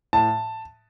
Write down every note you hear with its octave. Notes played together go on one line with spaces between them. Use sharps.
A2 A5